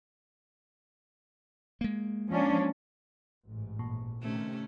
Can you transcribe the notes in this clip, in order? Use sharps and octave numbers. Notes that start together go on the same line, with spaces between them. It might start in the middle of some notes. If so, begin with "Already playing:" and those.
G#3 A#3
F3 C#4 D4
A1 G#2
A#2
C3 D#3 A3 C#4